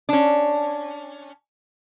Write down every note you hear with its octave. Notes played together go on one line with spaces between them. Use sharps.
C#4 D4